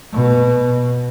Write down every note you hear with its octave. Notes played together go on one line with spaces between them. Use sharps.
B2